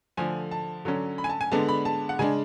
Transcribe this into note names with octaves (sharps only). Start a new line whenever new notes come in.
D3 F3 A3 G#5
A5
D3 F#3 C#4
B5
G#5
A5
G#5
D3 G#3 B3 D4 A5
B5
A5
F#5
C#3 G#3 D4 G#5